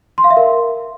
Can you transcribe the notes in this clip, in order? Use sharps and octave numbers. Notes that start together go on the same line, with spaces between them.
C6
F5
E5
A#4